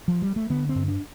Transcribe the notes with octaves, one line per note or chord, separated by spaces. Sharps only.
F3
G3
A3
D3 B3
C4
G2
D4